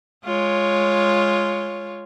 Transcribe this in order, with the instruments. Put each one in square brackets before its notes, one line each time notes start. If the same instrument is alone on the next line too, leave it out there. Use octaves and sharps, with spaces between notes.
[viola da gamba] G#3 F4 C#5